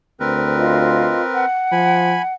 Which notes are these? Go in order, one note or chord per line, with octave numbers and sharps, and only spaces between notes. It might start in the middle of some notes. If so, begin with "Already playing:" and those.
D2 C4 A#4 B4
F4 D#5
F#5
F3 G#5 B5